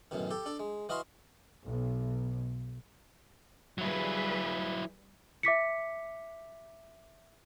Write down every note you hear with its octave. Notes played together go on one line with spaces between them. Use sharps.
A1 F#2 B2 D#3
G4 A4
D4 A4
G#3
E3 F#4 D#5 F5 B5 C6
B1
F#3 G3 E4 G#4 B4
E5 D6 B6 C#7